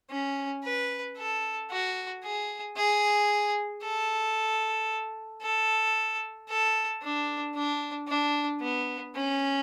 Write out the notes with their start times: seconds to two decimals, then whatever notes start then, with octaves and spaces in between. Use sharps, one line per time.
0.11 C#4
0.64 B4
1.17 A4
1.71 F#4
2.24 G#4
2.77 G#4
3.83 A4
5.42 A4
6.49 A4
7.02 D4
7.55 D4
8.08 D4
8.61 B3
9.15 C#4